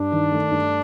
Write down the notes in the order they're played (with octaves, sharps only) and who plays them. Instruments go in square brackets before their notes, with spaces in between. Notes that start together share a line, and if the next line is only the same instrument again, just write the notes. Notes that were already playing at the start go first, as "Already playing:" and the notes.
Already playing: [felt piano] G2 [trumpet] D4
[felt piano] D#3
A3
G2